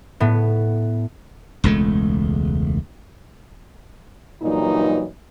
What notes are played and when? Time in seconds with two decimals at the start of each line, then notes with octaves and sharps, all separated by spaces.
0.20 A2 B3
1.64 E1 C#2 G#3 A3
4.42 G2 A#2 E3 F#3 D#4